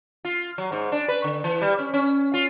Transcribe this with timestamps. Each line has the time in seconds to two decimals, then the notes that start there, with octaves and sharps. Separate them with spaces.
0.25 F4
0.58 F#3
0.72 G#2
0.92 D4
1.08 B4
1.24 D3
1.44 E3
1.62 G3
1.79 C#4
1.94 C#4
2.34 F4